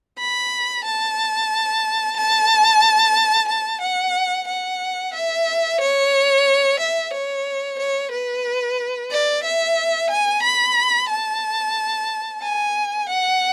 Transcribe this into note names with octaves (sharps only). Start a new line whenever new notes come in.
B5
A5
A5
A5
F#5
F#5
E5
C#5
E5
C#5
C#5
B4
D5
E5
G#5
B5
A5
G#5
F#5